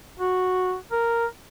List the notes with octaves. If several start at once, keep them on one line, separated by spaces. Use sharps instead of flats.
F#4
A#4